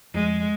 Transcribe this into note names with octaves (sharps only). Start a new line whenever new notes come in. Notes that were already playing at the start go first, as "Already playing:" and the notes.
F2 G#3